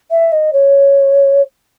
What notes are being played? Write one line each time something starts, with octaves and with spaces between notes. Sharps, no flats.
E5
D#5
C#5